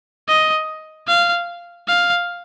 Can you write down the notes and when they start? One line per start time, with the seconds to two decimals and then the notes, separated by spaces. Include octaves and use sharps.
0.28 D#5
1.08 F5
1.88 F5